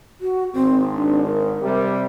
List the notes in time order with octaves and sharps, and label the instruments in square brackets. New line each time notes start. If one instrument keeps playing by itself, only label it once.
[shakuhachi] F#4
[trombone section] G#1 [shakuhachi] C4
[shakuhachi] D4
A#4
[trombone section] C3 G3